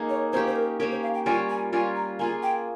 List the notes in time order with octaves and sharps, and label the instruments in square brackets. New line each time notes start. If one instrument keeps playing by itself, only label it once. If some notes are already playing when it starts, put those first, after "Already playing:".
Already playing: [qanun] A#3 D#4 G#4
[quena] C#5
[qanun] A#3 C#4 G4 [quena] C5
[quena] C5
A#4
[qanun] A#3 C#4 G4 [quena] A#4
[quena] C5
F5
G5
[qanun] G3 C#4 F4 A#4 [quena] G#5
[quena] G#5
[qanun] G3 C#4 F4 A#4 [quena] G#5
[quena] A#5
[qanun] A#3 F4 G#4 [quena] G#5
[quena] G5